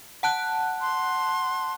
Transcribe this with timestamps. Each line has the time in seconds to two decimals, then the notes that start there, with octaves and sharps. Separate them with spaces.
0.23 F#5 A5 F#6
0.81 C6